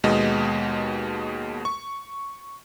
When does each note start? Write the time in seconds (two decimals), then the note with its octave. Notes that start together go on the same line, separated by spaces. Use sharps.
0.04 D#2 B2 G#3 B3 D#5
1.65 C#6